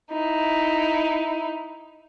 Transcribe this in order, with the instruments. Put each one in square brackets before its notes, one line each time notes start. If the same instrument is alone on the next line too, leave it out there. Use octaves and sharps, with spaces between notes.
[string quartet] D#4 E4